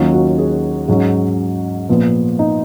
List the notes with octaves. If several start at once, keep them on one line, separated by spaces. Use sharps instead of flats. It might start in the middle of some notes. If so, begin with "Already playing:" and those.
Already playing: D#2 D#3 F#3 C#4 F4
F#4
G#4
G#2 F#3 C#4 G#4
A#2 F3 B3
D#4